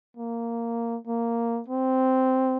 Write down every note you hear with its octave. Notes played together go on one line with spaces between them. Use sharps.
A#3
A#3
C4